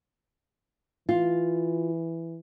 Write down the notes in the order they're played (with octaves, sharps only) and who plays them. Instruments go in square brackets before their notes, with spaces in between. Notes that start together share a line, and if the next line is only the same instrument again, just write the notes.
[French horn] E3 [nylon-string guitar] F4